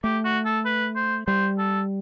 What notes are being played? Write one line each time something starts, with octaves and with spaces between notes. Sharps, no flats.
A3 G4
F#4
A4
B4
C5
G3 C5
A4